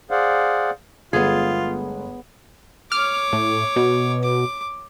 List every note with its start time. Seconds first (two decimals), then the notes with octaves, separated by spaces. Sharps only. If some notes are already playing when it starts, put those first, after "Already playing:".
0.11 G#4 C5 D5 F5 F#5
1.13 G1 G#3 A3 B3 F4 G#4
2.92 C#5 D6 F6
3.33 A2
3.76 B2
4.24 D6